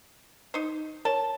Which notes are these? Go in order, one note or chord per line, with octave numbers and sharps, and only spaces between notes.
D#4 C5
A#4 C#5 A5